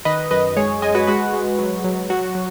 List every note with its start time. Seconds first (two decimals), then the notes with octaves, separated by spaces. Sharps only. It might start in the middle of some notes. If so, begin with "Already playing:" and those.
0.05 D#3 B4 D#5
0.31 F#2 B4 D#5
0.57 G#3 G#4 C#5
0.82 G#3 D#5 G#5
0.95 F#4 B4
1.07 G#3 F#4 B4
1.33 G#3
1.59 F#3
1.84 F#3
2.10 F#3 F#4
2.35 F#3